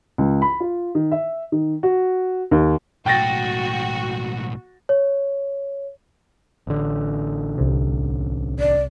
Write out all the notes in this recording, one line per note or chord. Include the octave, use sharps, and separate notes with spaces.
C#2
B5
F4
D#3
E5
D#3
F#4
D#2
B1 A2 F#4 G5 A6 A#6
C#5
A1 D3
C2 C3
D5